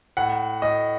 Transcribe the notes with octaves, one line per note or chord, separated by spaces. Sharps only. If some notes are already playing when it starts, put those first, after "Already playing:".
A2 F#5
A2 D#5